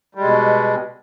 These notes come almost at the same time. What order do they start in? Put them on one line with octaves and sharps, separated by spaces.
G3 G#3 B2